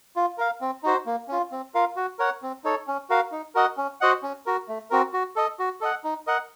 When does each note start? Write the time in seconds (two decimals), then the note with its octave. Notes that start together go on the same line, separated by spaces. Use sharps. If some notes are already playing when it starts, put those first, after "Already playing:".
0.16 F4
0.38 A#4 F5
0.61 C4
0.83 D#4 F#4 C5
1.06 A#3
1.28 C#4 F4
1.52 C4
1.74 F4 A#4 F5
1.96 F#4
2.19 A#4 C#5 F#5
2.42 C4
2.64 D#4 A4 C#5
2.87 C#4
3.10 F#4 A#4 F5
3.32 D#4
3.55 F#4 A#4 D#5 F#5
3.77 C#4
4.01 F#4 C5 D#5 F#5
4.23 C#4
4.46 F#4 A#4
4.68 A3
4.90 C4 F#4 A#4
5.13 F#4
5.36 A4 D#5
5.59 F#4
5.81 A4 D#5 F#5
6.04 D#4
6.27 A#4 D#5 F#5